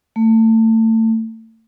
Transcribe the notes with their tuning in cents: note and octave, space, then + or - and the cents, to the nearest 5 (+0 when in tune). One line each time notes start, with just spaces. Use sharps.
A3 +30